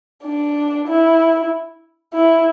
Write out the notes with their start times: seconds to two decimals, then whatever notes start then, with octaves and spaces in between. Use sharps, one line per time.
0.24 D4
0.87 E4
2.14 E4